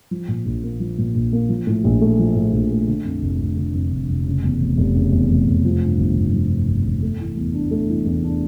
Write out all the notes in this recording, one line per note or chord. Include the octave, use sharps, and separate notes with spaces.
F3
A#2
A#1
A#3
F3
A#2
A#1
A#3
F3
A2
A#1
A3
F3
A2
A#1
A3
D3
F2
F1
F1
D3
F2
F1
F1
C#3
E2
F1
F1
C#3
E2
F1
F1
F3
G2
G1
G1
F3
G2
G1
G1
A3
E3
E2
D4
A3
E3
E2
D4